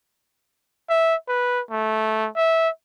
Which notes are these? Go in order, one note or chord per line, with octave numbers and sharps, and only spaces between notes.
E5
B4
A3
E5